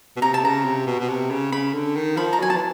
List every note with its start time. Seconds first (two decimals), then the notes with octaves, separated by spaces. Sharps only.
0.16 B2
0.21 C3 A#5
0.34 A5
0.44 C#3 A#5
0.65 C3
0.87 B2
0.99 B2
1.08 C3
1.31 C#3
1.52 C#3 B5
1.73 D3
1.95 D#3
2.17 F3 B5
2.33 A#5
2.39 F#3 G#5
2.50 A5
2.56 E3